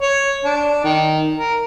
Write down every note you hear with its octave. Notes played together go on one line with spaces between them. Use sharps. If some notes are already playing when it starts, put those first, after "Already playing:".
C#5
D4
D#3
A#4